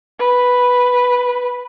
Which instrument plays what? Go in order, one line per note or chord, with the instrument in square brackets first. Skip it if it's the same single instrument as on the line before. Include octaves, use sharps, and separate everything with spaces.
[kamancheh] B4